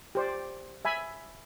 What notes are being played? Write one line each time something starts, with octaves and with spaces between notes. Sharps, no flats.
G4 C5 D5
E5 G#5 B5